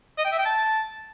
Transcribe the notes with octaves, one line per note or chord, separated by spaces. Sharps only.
D#5
G5
E5
G5
A5